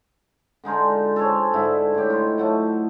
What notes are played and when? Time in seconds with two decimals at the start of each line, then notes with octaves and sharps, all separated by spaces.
0.64 D3 G#3 D#4 F4
1.16 A4 C5 C#5 G#5
1.54 G#2 D3 E4
1.95 A2 G4
2.10 D#4 F4
2.38 F#3 A3 F#4